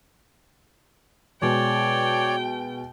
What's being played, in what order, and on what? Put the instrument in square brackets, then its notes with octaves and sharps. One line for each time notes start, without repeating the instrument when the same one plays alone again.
[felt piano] B2 G#3 [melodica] C#5 D5 [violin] G5